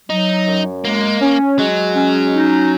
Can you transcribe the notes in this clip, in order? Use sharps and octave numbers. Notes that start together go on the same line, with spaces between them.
F#3 D#4
F#2
G#3 A#3
C#4
F#3 G#3
C#4
D#4